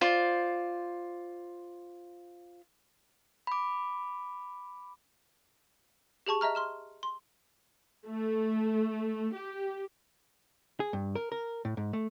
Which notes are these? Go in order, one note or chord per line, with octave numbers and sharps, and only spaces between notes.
F4 C5 D5
B5 D6
G4 G#4 A5 C#6
D#5 E5 A#5 F6
C6 F6 E7
C6
A3
G4
G#4
G2
A#4
A#4
A2
G#2
A3